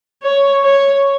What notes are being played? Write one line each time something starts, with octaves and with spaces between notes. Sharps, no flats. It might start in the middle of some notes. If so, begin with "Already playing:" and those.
C#5
C#5